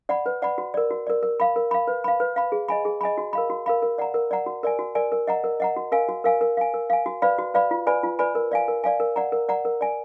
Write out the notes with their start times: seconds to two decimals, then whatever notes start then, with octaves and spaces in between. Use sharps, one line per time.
0.09 D5 F#5 B5
0.26 B4
0.42 D5 F#5 B5
0.58 F#4
0.74 A#4 D5
0.91 F#4
1.07 A#4 D5
1.23 A#4
1.40 F5 B5
1.56 A#4
1.71 F5 B5
1.88 B4
2.04 F5 B5
2.20 B4
2.36 F5 B5
2.52 G#4
2.69 D#5 G#5 B5
2.85 G#4
3.01 D#5 G#5 B5
3.18 F#4
3.33 A#4 F5 B5
3.50 F#4
3.66 A#4 F5 B5
3.82 A#4
3.98 D5 F#5 A#5
4.14 A#4
4.31 D5 F#5 A#5
4.46 F#4
4.63 A#4 D5 G#5
4.79 F#4
4.95 A#4 D5 G#5
5.12 A#4
5.27 D#5 F#5 A#5
5.44 A#4
5.60 D#5 F#5 A#5
5.76 F#4
5.92 A#4 F5 G#5
6.09 F#4
6.24 A#4 F5 G#5
6.41 A#4
6.57 F5 G#5
6.74 A#4
6.90 F5 G#5
7.06 F#4
7.22 B4 D5 F5 B5
7.38 F#4
7.54 B4 D5 F5 B5
7.71 F4
7.87 B4 D5 G#5 B5
8.03 F4
8.19 B4 D5 G#5 B5
8.35 A#4
8.52 D5 F5 G#5
8.68 A#4
8.84 D5 F5 G#5
9.00 A#4
9.16 D5 F#5 A#5
9.32 A#4
9.49 D5 F#5 A#5
9.65 A#4
9.81 D5 G#5